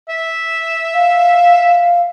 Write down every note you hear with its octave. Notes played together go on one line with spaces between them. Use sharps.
E5
F5